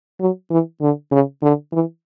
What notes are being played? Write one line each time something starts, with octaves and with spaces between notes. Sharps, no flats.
F#3
E3
D3
C#3
D3
E3